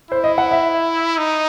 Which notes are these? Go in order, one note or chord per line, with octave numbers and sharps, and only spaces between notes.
E4 C5
D#5
F#5
E5
D#4